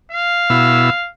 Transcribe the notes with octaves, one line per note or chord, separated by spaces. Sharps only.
F5
B2 E4 E6